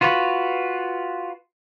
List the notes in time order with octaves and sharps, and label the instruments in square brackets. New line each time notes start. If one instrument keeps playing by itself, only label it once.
[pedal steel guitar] F4 F#4 B4